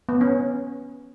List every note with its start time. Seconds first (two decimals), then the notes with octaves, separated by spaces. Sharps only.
0.09 B3
0.21 C#4